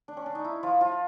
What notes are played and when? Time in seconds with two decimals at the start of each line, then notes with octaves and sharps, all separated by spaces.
0.08 D4
0.17 C#4
0.26 D4
0.35 D#4
0.44 E4
0.63 F3 F4
0.81 F3 F4